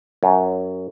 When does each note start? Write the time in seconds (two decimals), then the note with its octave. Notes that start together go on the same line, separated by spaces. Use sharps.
0.23 F#2